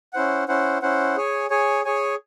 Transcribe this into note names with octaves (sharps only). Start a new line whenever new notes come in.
C#4 E4 C5 F#5
C#4 E4 C5 F#5
C#4 E4 C5 F#5
G#4 C#5 G#5
G#4 C#5 G#5
G#4 C#5 G#5